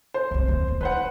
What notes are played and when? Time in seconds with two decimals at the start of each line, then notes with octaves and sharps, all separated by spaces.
0.14 C5
0.31 C2 G2
0.48 D#2
0.68 B3
0.81 D#4 B4 C5 F#5